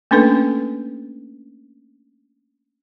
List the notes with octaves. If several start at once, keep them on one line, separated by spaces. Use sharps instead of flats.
A3 A#3 C#4 D4 A4 B4